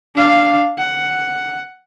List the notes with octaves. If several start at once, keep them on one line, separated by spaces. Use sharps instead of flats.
D4 F5
F#5